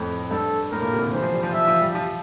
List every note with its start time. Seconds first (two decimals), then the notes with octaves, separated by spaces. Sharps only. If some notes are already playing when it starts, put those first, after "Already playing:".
Already playing: F2 A2
0.31 G2 A4
0.72 A2 A#4
0.82 A#2
0.93 C3
1.02 D3
1.13 E3 C5
1.22 F3
1.33 G3
1.43 F3
1.54 F3 E5
1.67 F3
1.81 G3
1.95 F3